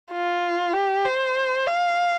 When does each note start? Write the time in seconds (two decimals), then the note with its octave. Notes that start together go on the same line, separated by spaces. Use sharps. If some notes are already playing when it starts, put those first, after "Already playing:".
0.12 F4
0.73 G4
1.05 C5
1.67 F5